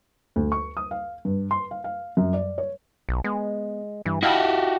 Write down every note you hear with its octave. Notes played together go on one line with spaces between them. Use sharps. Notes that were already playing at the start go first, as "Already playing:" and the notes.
D2
C#6
D#6
F5
G2
C6
F5
F5
F#2
D5
C#5
B1
G#3 B3
G2 E3
E4 F#4 G4 D#5 F5 A5